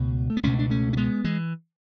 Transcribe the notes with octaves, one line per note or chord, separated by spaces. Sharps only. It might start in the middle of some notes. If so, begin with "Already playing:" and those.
Already playing: C#2 B2 A3
A3
B3
C#2 B2 A3 C#4
D4
A3 C#4
C#4
G#3 B3
E3 G#3